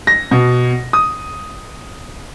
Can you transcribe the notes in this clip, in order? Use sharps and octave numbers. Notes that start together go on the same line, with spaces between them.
A#6
B2
D#6